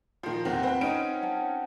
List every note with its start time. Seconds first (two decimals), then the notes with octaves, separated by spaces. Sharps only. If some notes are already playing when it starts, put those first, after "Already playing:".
0.23 A#2 D#3 F3 A#5 C6
0.45 E2 C3 D#3 C4 F#5
0.63 C4 B4 C5 G5 C6
0.81 C#4 D#4 D7
1.22 F#5 A5